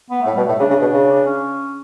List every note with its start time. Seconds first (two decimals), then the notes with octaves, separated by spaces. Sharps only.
0.10 B3
0.22 A2 A3
0.34 B2 G3
0.47 A2 A3
0.60 C#3 D4
0.70 C#3
0.81 B2
0.93 C#3
1.12 D4
1.26 C#4